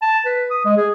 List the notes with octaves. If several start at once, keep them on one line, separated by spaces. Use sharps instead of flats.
A5
B4
D#6
G#3
G#4